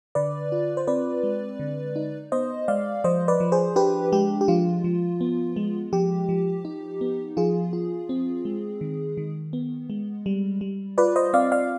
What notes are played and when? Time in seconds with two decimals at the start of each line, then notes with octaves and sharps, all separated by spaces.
0.15 D3 B4 D5
0.52 F4
0.77 C5
0.87 C4 B4 D5
1.23 G#3
1.59 D3
1.96 D#4
2.32 B3 C5 D#5
2.68 G#3 D5 F5
3.04 F3 C5 D#5
3.28 B4 D5
3.40 F3
3.52 G#4 C5
3.76 D4 G4 B4
4.12 G#3 G4
4.41 G4
4.48 F3 F4
4.84 F3
5.21 B3
5.56 G#3
5.93 F3 G4
6.29 F3
6.65 D#4
7.01 B3
7.37 F3 F4 G#4
7.73 F4
8.09 C4
8.45 G#3
8.81 D#3
9.17 D#3
9.53 B3
9.90 G#3
10.26 G3
10.61 G3
10.98 F4 B4 D5
11.16 C5 D#5
11.33 C4 D5 F5
11.52 D5 F5